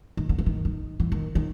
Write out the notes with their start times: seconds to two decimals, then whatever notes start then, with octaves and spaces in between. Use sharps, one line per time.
0.17 D#3
0.29 D3
0.38 E3
0.46 D#3
0.65 D#3
1.00 E3
1.12 D#3
1.35 D#3